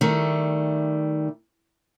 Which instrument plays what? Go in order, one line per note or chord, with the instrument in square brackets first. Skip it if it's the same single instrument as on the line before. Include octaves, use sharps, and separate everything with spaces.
[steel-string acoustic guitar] D#3 G3 A3